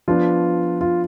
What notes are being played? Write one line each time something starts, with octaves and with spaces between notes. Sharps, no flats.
F3 B3 D4 F4
F4